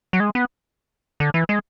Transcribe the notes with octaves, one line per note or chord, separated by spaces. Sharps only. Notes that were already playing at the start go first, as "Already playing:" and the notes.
F#3
G#3
B3
D3
E3
G#3